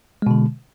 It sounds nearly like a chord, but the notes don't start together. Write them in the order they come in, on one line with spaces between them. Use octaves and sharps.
G#3 B2 D3